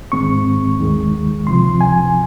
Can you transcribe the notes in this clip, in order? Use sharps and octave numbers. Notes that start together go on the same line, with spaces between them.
G#2 D#3 G#3 C4 C#6
D#2 D#3 G#3
C#2 C3 F3 C6
G#5